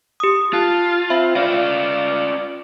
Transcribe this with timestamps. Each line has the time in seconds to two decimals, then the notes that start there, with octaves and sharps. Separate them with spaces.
0.20 G4 D#6
0.53 F4 A5 F#6
1.10 C4 E5 F5 B5
1.36 C#4 F4 D5 F5